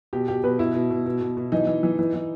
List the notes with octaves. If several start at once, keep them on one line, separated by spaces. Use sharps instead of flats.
B2 G4
B2 G4
B2 B4
B2 E4
B2
B2
B2
B2
B2
E3 D#4
E3
E3
E3
E3